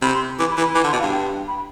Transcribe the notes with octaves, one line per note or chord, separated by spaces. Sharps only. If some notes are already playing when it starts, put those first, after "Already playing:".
C3 B5
C6
E3 D6
B5
E3
B5
E3 D6
D3
C6
B2
F5
G2
G5
B5